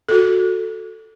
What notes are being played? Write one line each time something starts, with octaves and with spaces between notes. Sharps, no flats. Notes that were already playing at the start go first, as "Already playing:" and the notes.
F#4 A4